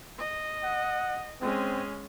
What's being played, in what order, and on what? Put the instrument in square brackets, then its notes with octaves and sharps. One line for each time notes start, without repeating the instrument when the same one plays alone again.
[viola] D#5
[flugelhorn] F#5
[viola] G#3 C#4 [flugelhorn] C4